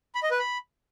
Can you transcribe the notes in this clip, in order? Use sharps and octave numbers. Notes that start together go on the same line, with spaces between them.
B5
D#5
B4
B5